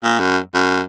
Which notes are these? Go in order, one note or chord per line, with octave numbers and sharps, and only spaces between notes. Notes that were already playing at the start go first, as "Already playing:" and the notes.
A#2
F#2
F#2